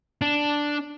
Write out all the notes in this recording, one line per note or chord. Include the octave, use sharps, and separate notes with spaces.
D4